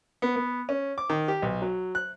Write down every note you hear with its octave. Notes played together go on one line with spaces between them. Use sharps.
B3
B3
C#4
D6
D#3
G4
B1
F#3
F#6